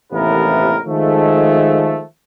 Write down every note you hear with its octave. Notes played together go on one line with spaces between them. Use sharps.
A1 D#2 C3 E3 B3 A#4
D#3 F3 G#3 A3